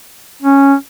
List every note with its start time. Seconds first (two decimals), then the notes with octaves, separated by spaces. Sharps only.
0.42 C#4